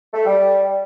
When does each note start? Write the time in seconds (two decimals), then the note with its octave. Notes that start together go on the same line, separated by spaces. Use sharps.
0.14 A3
0.25 G3